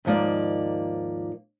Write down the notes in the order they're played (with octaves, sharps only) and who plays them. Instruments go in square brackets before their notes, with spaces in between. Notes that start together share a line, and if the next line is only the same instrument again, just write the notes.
[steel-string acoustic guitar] D#2 G#2 F3 A#3 D5